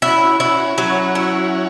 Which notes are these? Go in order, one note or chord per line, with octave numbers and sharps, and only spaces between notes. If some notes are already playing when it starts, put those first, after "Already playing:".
C#4 E4 F#4
C#4 E4 F#4
F#3 C#4 F#4
E4